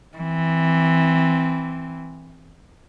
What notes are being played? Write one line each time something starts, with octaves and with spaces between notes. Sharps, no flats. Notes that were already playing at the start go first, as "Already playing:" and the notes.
E3 C4